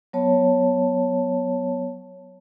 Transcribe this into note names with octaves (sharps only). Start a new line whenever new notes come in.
F#3 B3 C#5 A5